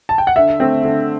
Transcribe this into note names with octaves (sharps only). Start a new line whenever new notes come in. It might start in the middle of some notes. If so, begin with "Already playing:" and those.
A5
G5
F#5
D3 E5
A3 C4
D3